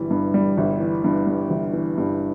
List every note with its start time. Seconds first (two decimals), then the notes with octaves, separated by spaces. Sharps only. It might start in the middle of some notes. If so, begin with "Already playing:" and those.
Already playing: G1 G2 E3 G3
0.11 G2
0.34 G3
0.57 G1
0.80 E3
1.04 G2
1.27 G3
1.50 G1
1.73 E3
1.98 G2